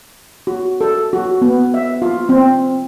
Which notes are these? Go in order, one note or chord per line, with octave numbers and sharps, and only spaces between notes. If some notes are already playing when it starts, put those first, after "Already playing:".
F#4
A4
F#4
B3
E5
F4
C4